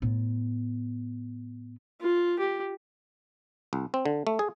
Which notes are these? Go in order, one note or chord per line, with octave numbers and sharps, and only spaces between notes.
A2 B3
F4
G4
C2
C4
D3
A3
G#4